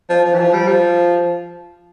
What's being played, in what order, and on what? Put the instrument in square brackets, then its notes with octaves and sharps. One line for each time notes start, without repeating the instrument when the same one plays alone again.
[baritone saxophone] F3
F3
E3
F3
G3
F3